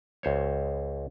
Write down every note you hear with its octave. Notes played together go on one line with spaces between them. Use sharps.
C#2 C5 C#5